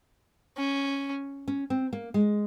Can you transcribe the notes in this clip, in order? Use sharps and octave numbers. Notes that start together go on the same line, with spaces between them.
C#4
C#4
C4
A#3
G#3